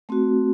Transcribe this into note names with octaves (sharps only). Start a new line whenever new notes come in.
A3 C4 F#4